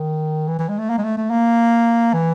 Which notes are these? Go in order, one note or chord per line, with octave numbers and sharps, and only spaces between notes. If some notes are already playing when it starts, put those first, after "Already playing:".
Already playing: D#3
E3
E3
G#3
A3
A#3
G#3
A3
A3
A#3
E3